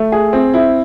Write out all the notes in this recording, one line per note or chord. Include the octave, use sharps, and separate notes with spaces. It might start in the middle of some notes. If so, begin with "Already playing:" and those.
Already playing: A3
G#4
C4
E4